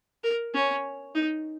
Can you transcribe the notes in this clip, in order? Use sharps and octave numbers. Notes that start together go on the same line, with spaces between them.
A#4
C#4
D#4